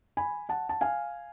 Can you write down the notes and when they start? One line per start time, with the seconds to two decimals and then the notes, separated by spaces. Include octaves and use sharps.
0.17 G#5 B5
0.49 F#5 A5
0.69 A5
0.81 F5 G#5